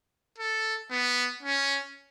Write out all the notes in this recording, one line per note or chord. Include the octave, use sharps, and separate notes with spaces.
A4
B3
C#4